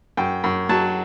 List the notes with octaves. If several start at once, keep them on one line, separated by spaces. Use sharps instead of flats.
F#2 G5
F#2
F#3 A5